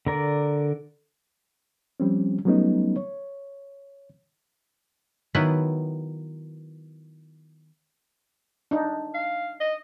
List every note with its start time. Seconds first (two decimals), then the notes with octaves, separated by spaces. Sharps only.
0.06 D3 A#4 D5
2.00 F3 G3 C4 C#4
2.45 F#3 G3 A3 B3 C#4 D#4
2.96 C#5
5.35 D#3 F#3 B3 E4 B4
8.71 D4 D#4
9.15 F5
9.60 D#5